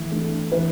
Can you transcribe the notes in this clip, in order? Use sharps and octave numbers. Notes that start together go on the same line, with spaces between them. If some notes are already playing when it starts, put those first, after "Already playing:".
Already playing: E3 A3
A3 D4
E3 B4